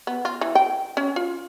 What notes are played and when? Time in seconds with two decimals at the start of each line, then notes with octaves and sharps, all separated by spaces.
0.07 B3
0.25 F4
0.41 E3
0.55 G5
0.97 C#4
1.16 F4